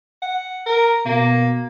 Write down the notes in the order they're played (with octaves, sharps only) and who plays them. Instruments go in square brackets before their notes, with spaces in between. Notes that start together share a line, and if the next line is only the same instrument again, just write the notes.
[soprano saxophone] F#5
A#4
[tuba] B2 [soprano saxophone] A#3